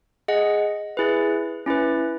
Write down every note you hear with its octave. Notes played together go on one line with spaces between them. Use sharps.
G#4 D#5 F#5
E4 G#4 B4
C#4 E4 B4